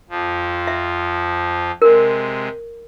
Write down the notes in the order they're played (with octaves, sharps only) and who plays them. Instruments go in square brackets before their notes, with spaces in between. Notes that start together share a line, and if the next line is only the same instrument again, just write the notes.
[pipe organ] F2 F3
[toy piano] E5
[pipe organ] C3 G#3 [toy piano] A#4